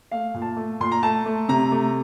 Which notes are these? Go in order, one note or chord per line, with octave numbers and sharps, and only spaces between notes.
A3 F5
A#2
A5
A3
A#2 C6
A#5
A3 A5
A3
C3 A#5
A3